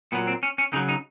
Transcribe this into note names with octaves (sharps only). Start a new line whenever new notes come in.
A#2 F#3 B3
C4
C#4
C#4
C#3 F#3 D#4
D#4